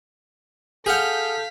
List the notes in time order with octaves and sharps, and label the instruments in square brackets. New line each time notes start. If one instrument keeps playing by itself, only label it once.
[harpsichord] G#4 F#5 [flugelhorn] A4 [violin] F5 B6 [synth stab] F6 G6